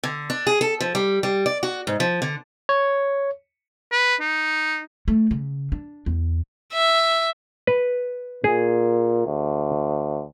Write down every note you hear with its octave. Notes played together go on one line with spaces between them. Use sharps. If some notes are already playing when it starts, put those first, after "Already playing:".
D3
D4
G#4
A4
F3
G3
G3
D5
F#4
G#2
F3
D3
C#5
B4
D#4
A3
C#3
D4
E2
E5
B4
A#2 G#4
D2